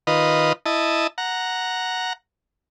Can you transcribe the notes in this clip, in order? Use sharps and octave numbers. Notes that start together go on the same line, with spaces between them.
D#3 F4 B4 D#5
E4 D#5 A5
F#5 A#5